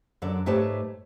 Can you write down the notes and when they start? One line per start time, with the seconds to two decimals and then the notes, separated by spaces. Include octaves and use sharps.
0.22 F#2 D3 A4 D5
0.46 G#2 A3 G4 B4 C#5 A5